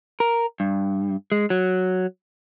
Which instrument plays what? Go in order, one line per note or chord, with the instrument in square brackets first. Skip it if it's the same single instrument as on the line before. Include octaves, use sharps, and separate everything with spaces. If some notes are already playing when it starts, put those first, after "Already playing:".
[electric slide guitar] A#4
G2
G#3
F#3